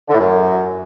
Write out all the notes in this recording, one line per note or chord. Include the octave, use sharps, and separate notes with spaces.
D3
A2
F#2